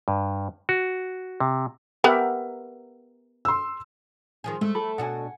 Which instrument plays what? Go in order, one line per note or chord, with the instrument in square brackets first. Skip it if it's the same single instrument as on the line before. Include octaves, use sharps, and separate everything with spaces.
[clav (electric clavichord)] G2
F#4
C3
[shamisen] B3 F#5 [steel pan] G4 A#4 E5
[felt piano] C6 E6
[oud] D#3 F3 G#4
[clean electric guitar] G#3 [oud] A3
[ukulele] A4 [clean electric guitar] B5
[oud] B2 D4 F#4 [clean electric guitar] F#5 G#5